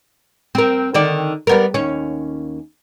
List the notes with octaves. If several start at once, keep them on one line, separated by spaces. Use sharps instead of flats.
C4 A#4
D3 D#3 D5
G3 B3 A#4
D#2 C#4